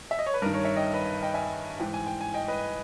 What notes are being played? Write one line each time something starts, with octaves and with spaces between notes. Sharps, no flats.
E5
D#5
C#5
B4
G2 D#3 A#4
A#4 C#5
C#5 E5
D#5 G5
B4 D#5
D#5 G5
E5 G#5
G#2 E3 G5
G#5
G5
G#5
D#5 G5
B4 D#5